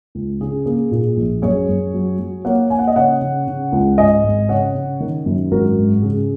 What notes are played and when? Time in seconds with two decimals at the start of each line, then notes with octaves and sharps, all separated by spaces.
0.15 C#2
0.40 C#3 G#4
0.66 A#3 G#4
0.91 A#2 G#4
1.17 A#1
1.42 F#2 G#4 C#5
1.68 F#2
1.94 F#3
2.19 F#3
2.45 A#3 C#5 F#5
2.70 A#3 G#5
2.79 F#5
2.88 D#5
2.96 C#3 C#5 F#5
3.21 C#3
3.47 C#3
3.72 C#2
3.98 G#2 D#5 G#5
4.24 G#1
4.49 C#3 C#5 F#5
4.75 C#3
5.00 D#3
5.26 F#2
5.51 G#1 F#4 A#4
5.78 G#2
6.02 C#3 G#4